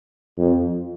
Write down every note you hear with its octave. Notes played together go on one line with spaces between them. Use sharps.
F2